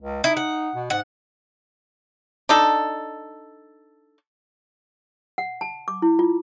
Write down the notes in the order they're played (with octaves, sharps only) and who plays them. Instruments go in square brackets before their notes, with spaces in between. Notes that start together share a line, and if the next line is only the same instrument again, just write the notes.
[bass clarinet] C#2
[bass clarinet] D#4 [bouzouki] E4
[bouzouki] F#5
[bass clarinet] B2
[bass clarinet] G#2 [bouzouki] F#5
[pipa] D4 D#4 A4
[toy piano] F#5
A5
D6
E4
F4